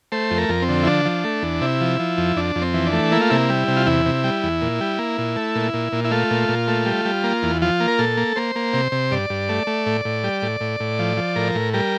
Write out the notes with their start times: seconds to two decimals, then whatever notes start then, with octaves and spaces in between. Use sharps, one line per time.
0.12 A3 C5
0.31 F2
0.38 A#4
0.49 F2
0.62 C4
0.69 D3
0.83 E4
0.87 F3 D4
1.05 F3
1.24 A3
1.43 E2
1.62 C3 E4
1.81 F3
1.99 F3
2.18 F2
2.36 F2 D4
2.55 F2
2.62 C4
2.74 E3
2.86 D4
2.93 A3
3.12 A#3 E4
3.21 F4
3.30 C3 E4
3.50 G3
3.68 C3
3.77 F4
3.86 E2 E4
4.06 C3
4.24 G3
4.44 E2
4.62 A#2
4.81 G3
4.99 A#3
5.18 A#2
5.36 A3
5.55 A#2
5.74 A#2
5.92 A#2
6.04 E4
6.11 A3 F4
6.31 A#2
6.49 A#2
6.68 A3
6.86 G3
7.05 G3
7.24 A#3
7.43 E2
7.62 F3 F4
7.80 A#3
7.88 A#4
7.99 A#2 A4
8.17 A#3
8.36 A#3 C5
8.56 A#3
8.73 C3
8.92 C3
9.11 G2 D5
9.30 G2
9.49 A3
9.67 A3
9.86 A2
10.05 A2
10.24 G3
10.42 A2
10.61 A2
10.80 A2
10.99 F3
11.17 F3
11.36 A2 A#4
11.55 A2
11.74 G3 A#4